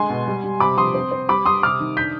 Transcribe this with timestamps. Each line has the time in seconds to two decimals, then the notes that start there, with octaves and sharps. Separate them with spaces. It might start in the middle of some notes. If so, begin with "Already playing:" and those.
Already playing: D3 G#3 G#5 C6
0.09 B2
0.27 G3
0.44 G3
0.60 C3 B5 D6
0.78 F3 C6 D#6
0.94 C4
1.11 C4
1.29 G3 B5 D6
1.45 G3 C6 D#6
1.62 C3 D6 F6
1.80 D#3
1.97 D4 G6 B6